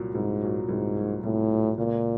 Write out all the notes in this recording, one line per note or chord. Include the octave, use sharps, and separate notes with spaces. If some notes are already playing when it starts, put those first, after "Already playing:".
Already playing: C2 A#2 F#3
C2 G#2
A#2 F#3
C2 G#2
A#2 F#3
C2 A2
A#2 F#3
C#2 A#2